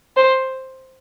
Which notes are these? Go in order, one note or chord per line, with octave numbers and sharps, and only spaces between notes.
C5